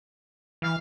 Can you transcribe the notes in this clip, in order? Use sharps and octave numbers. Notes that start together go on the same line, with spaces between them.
E3 F5